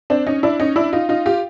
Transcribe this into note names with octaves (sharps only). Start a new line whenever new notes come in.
C4 D4
C#4 D#4
D4 E4
C#4 D#4
D4 E4
D#4 F4
D#4 F4
F4 G4